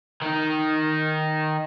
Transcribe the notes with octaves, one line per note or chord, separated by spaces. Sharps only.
D#3 D#4